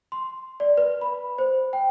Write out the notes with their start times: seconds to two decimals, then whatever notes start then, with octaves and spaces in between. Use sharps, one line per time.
0.12 C6
0.60 D5
0.77 B4
1.01 B5
1.38 C5
1.73 G5